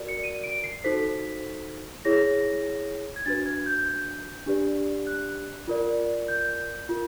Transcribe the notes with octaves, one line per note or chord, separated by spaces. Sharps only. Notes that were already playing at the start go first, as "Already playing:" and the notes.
Already playing: F#4 A#4 D5
C#7
D#7
D7
C7
D#4 F#4 A4 C5 B6
E4 G#4 C#5 A#6
G#6
D4 F#4 B4 A6
G#6
G6
G6
D4 G4 B4 D5
F#6
F4 A#4 D5
G6
F4 A#4